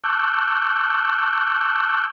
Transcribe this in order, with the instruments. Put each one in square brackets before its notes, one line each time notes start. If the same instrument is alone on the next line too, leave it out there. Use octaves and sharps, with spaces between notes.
[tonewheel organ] A5 C#6 D6 E6 F#6 G6